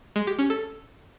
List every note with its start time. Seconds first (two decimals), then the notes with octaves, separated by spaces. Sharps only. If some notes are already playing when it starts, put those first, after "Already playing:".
0.16 G#3
0.27 G4
0.39 C#4
0.50 A4